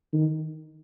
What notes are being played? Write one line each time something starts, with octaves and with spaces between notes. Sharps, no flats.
D#3